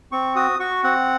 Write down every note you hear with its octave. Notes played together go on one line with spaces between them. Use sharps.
C4 C#6
F#4 D#6
F#4 C#6
C4 F#5